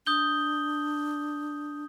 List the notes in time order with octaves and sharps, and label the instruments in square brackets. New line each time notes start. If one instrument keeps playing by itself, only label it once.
[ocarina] D4 [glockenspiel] D#6 G6 G7